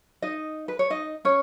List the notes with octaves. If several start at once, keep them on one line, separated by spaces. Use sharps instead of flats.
D#4 D#5
B4
C#5
D#4 D#5
C#4 C#5